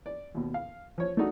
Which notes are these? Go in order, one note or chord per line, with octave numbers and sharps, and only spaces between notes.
D5
D#2 B2
F5
F3 C#5
A3 D4 D#4 F#4